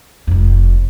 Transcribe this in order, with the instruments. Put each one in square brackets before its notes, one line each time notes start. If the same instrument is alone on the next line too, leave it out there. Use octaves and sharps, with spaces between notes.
[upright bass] F1 F2